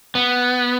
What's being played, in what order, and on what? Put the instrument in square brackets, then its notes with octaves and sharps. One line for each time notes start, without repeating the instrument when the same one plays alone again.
[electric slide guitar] B3